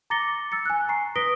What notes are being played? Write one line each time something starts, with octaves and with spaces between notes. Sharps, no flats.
A#5 D6 A6 A#6 C#7 G7
E6 A6 C#7
G#5 F#6
A#5 C#6 C7
B4 D#6 A#6 B6 D7 G7